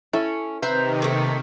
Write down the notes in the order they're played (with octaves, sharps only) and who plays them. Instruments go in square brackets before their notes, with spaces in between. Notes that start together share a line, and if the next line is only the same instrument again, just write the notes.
[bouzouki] C#4 [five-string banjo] E4 A4
[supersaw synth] C3 D#3 [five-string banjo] B4 [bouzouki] C5 E5 A#5
[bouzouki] A3 A#3